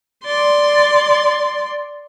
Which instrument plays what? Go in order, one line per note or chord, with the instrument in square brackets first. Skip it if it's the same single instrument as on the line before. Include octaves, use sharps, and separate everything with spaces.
[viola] D5 C6